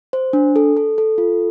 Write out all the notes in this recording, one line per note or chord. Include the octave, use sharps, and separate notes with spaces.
C5
D4
A4
A4
A4
F4